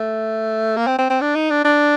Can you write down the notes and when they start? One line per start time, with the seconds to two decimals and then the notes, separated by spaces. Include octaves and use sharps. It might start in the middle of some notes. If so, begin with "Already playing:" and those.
Already playing: A3
0.77 A#3
0.87 C4
0.98 C4
1.10 C4
1.21 D4
1.35 D#4
1.50 D4
1.65 D4